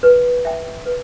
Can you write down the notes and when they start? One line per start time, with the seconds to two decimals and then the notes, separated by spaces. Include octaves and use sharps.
0.03 B4
0.45 E5 G5
0.86 B4